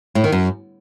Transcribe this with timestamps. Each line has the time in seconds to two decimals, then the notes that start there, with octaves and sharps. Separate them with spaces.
0.15 A2
0.24 D#3
0.32 F#2